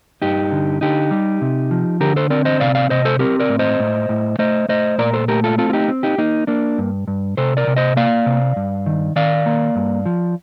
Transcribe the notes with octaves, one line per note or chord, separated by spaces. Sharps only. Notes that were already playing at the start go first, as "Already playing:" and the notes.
G2 D#4 G4
D3
D3 D#4 G4
G3
C3
F3
D3 G4 A#4
A4 C5
C4 A#4 D5
C5 D#5
C3 D5 F5
D5 F5
C3 C5 D#5
A4 C5
C4 G4 A#4
A#4 D5
A2
C5 D#5
A2
A2
A3 C5 D#5
A3 C5 D#5
A#2 A#4 D5
A4 C5
A3 G4 A#4
F4 A4
C4 F4 A4
F4
D#4 G4
C4
D#4 G4
A#3 D#4
A#3 D4
G2
G2
C3 A4 C5
A#4 D5
C3
C5 D#5
A#3 D5 F5
C3
G2
D#3
D#3 D5 F5
A#3
G2
F3